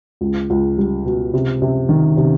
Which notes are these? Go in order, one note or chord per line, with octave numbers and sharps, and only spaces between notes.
C#2
C#2
G3
B2
C3
C3
D#3
C3